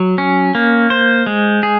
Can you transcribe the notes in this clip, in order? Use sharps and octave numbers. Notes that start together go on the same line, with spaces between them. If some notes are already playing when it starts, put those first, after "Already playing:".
Already playing: F#3
C#4
A#3
C5
G#3
G#4